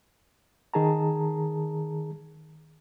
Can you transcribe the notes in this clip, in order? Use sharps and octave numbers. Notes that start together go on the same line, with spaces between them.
D#3 G#4 A5 A#5